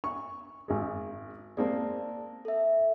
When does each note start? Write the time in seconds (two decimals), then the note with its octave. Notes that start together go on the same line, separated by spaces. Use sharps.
0.04 C#6
0.68 G#1 G#3
1.57 G#3 A#3 C4 D5 A5
2.45 A4 E5